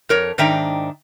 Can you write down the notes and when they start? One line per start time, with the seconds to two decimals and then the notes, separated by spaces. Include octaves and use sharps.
0.09 F2 A#4 C#5
0.38 G#2 D#3 D4 E5 G5 A#5